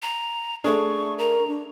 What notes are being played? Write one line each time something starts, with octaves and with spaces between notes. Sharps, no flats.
A#5
A3 D4 G#4 C#6
A#4 A#5
D4